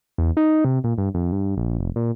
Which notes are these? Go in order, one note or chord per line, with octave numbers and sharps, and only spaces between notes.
E2
D#4
C3
A#2
G2
F2
G2
A#1
F1
A#2